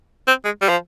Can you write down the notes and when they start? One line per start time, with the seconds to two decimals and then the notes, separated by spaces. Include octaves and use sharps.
0.28 C4
0.45 G#3
0.62 G3
0.69 F3